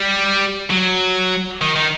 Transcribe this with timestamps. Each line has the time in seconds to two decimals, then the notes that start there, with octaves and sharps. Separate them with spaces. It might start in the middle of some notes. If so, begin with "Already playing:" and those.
Already playing: G3
0.70 F#3
1.61 D#3
1.76 D#3